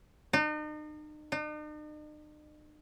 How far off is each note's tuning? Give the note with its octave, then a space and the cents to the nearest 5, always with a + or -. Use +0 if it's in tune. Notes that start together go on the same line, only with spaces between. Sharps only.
D#4 -40
D#4 -45